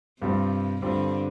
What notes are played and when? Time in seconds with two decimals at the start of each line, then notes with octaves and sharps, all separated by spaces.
0.22 G2 C3 G3 C4 F4
0.82 G2 D3 G3 C4 F4